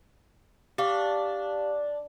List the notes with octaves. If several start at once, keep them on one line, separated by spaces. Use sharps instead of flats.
D4 G4 F5